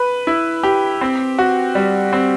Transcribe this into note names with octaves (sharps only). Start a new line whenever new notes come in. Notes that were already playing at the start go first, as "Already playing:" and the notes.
Already playing: B4
E4
G4
C4
F#4
G3
C4